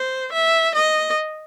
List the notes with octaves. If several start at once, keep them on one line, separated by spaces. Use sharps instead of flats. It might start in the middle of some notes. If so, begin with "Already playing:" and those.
Already playing: C5
E5
D#5